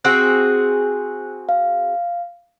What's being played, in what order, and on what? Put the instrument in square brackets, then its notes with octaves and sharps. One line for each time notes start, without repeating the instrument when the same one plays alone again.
[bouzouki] C4 F#4 G#4 [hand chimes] F#6
[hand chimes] F5